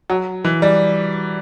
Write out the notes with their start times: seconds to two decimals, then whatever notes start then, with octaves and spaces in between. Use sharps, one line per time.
0.10 F#3
0.44 E3
0.62 G3